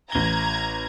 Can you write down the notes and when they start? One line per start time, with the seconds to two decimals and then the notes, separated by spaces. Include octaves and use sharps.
0.12 A1 A#5 G#6 G7